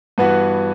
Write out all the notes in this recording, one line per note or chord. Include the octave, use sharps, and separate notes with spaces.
G2 E3 B3 F#4